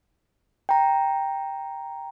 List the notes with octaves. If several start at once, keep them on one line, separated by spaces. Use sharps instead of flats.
G5 A#5